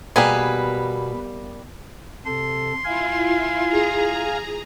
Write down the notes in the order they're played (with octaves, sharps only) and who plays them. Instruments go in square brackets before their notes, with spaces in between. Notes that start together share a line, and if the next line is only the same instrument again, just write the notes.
[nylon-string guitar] B2 [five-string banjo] G3 A#3 [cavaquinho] G#4 B4 G#5
[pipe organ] C3 A4 [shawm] C6
[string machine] E4 F4 [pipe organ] F5 G#5
[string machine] G#4 A#5